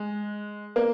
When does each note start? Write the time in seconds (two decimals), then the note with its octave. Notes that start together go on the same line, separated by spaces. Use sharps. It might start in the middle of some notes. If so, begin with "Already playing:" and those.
Already playing: G#3
0.76 A#3